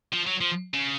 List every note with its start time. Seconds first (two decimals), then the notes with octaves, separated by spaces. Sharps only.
0.13 F3
0.27 F#3
0.41 F3
0.74 C#3